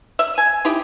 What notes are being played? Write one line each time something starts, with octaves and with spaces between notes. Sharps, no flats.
E5
G#5
D#4 E4 G4